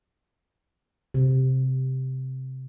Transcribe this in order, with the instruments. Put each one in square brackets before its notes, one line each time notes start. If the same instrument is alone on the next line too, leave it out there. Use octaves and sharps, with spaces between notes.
[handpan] C3